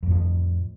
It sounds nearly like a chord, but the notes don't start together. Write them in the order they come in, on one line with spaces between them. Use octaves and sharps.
F2 A2 F3